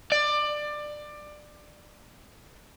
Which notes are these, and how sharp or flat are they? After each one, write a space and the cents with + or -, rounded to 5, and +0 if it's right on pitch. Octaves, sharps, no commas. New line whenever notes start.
D5 +20